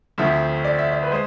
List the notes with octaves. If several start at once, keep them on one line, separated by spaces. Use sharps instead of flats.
D2 D3 F3 A3 C4 E5
D5
E5
D5
B4
G#3 C5